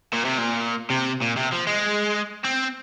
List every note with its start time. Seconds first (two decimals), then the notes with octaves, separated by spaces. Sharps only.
0.13 A#2
0.25 C3
0.38 A#2
0.90 C3
1.22 A#2
1.37 C3
1.52 F3
1.67 G#3
2.44 C4